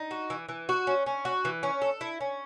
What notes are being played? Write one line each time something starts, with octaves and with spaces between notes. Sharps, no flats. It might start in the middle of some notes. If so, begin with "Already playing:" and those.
Already playing: D#4
F#4
E3
E3
F#4
C#4
C#4
F#4
E3
C#4
A4
E4
C#4